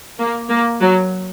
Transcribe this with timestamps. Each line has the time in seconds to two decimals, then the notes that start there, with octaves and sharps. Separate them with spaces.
0.19 A#3
0.49 A#3
0.80 F#3